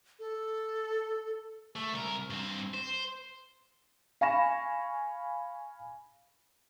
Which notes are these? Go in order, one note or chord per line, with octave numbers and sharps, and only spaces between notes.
A4
A3
C2 A#4
G2 C4
C5
F5 G#5 B5 C#6 A#6 E7